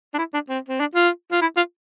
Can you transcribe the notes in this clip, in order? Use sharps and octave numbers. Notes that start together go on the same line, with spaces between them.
D4
E4
D4
C4
C4
D4
F4
F4
E4
F4